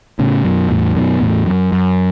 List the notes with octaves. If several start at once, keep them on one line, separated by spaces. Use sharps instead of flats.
A2 C#3
F#2 B2
E2 A2
F#2 B2
E2 A2
F#2
F#2